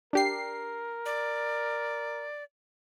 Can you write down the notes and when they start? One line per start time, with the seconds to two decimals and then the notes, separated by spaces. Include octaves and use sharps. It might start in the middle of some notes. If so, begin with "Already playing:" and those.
0.13 D4 G4 A#4 C7
1.06 D5